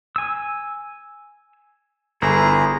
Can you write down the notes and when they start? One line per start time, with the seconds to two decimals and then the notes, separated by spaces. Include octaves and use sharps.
0.16 G#5 E6
2.22 G1 E4 G#4 A#5